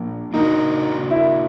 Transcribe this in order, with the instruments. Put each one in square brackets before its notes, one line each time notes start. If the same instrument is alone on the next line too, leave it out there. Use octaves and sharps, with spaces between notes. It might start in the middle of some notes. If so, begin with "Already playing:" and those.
Already playing: [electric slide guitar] F3 A#3 D4 F4
[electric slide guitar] A#3 D4 F#4 A#4 [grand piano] D#4
[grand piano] E4